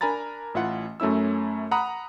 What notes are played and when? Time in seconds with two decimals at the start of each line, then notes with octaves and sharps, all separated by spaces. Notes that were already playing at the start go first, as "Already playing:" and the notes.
0.01 D4 A#4 G#5 A#5 B5 A6
0.54 A1 E4 F4 F#5
1.00 F#2 A3 C#4 E4 E6
1.71 F#5 A#5 B5 D#6